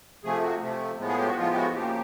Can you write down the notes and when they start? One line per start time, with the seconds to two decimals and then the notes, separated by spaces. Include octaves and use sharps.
0.24 C3 F3 A3 G#4
0.43 F#4
0.61 C3 F3 A3
0.99 A2 F3 G#3 B3
1.08 G#4
1.18 G4
1.28 F#4
1.37 A2 F3 G#3 B3 F4
1.49 G4
1.56 F#4
1.74 C#3 F3 A#3 G4